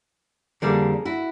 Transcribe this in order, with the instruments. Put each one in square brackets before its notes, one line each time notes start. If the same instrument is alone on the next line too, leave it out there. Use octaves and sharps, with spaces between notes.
[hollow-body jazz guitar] F2 D3 G3 A#3 D4 [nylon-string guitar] G#4 A#4
[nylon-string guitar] E4 F#4